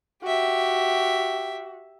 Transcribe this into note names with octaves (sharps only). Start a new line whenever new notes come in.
F#4 G4 E5